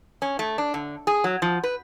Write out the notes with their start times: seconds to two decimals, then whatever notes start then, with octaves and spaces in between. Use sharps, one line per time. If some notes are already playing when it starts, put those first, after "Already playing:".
0.22 C#4
0.39 A3
0.58 D4
0.74 D3
1.07 G#4
1.24 F#3
1.42 F3
1.63 B4